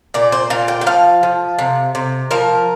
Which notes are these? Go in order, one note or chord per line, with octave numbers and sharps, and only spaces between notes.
A#2 D5
C5
A#2 F5
G5
G5
F3 F5
F3
C3
C3
F3 A#4